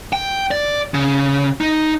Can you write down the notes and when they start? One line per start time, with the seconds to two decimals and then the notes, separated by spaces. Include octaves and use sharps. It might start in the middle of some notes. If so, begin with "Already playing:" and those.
0.13 G5
0.51 D5
0.94 C#3
1.61 D#4